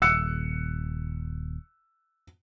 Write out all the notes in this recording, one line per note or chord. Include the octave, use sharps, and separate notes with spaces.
D#1 E6 F#6 C#7